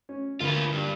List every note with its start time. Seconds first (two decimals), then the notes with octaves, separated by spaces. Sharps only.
0.09 C#4
0.40 D2 A#3 F4 B4
0.72 G2